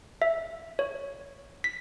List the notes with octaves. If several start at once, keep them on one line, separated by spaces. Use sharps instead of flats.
E5
C#5
B6